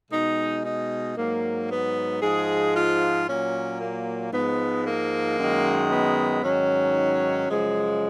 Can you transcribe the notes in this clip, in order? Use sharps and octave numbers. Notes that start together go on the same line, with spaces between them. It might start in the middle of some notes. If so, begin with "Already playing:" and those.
B2 G#3 D#4
D#4
G#2 F#3 A#3
B3
G#2 F3 G#3 G#4
F4
A#2 F#3 C#4
A#3
G#2 F3 G#3 B3
A#3
F#2 D#3 G#3
B3
G#2 D#3 F#3 C#4
F#2 C#3 F3 G#3